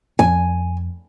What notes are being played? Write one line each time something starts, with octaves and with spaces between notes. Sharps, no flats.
F2 G#5